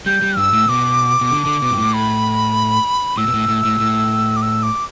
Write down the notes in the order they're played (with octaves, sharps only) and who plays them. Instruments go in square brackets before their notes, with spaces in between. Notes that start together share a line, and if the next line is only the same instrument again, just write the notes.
[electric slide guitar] G3 [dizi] G6
[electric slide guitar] G3
[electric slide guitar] G2 [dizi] E6
[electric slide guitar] A2
[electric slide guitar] B2 [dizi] D6
[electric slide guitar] B2
D3
D3
B2
G2
A2
[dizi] B5
[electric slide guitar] A2 [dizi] E6
[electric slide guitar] B2
A2
A2
A2
A2
[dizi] D6
E6
D6